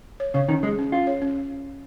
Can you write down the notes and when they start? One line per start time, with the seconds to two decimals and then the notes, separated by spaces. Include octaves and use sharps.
0.20 C#5
0.34 C#3 C#5
0.49 D#3 C#4
0.63 G#3 G#4
0.79 C#4
0.92 C#4 F4
1.07 C#5
1.22 C#4